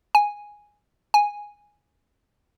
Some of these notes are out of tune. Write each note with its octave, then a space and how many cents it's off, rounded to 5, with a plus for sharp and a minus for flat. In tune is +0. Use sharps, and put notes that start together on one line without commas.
G#5 -5
G#5 -5